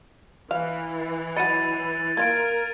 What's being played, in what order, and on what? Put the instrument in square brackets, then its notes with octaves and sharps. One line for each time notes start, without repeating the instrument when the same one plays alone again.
[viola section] E3 [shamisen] F5
[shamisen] F#3 D#5 [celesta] B5 [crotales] A6 C#7 D#7
[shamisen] A#3 F4 [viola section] A#4 [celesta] G#6 D7